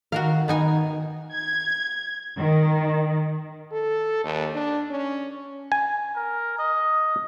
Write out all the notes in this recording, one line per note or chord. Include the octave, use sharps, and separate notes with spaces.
D#3 F#4 A#4 F5
B3 D#4 G#5
G#6
D#3
A4
D#2
D4
C#4
G#5
A#4
D#5